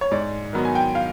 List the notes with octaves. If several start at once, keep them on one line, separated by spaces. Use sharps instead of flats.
C#5
G#2 D5
D#3 F#3 B3
G#5
G5
F5